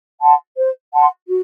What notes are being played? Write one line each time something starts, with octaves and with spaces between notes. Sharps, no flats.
F#5 A5 C6
C5
F#5 A5 C6
F#4